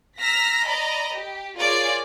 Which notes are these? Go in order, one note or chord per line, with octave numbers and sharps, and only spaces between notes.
A#5 E6 F6 A#6 B6
D5 D#5 A#5 B5
G4
F4 G#4 A#4 C#5 D5